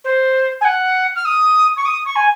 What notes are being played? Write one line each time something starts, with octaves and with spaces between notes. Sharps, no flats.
C5
G#5
F#5
F6
D#6
C#6
D#6
C#6
G#5